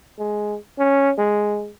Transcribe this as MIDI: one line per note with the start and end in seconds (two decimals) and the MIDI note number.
0.19 0.56 56
0.78 1.11 61
1.18 1.71 56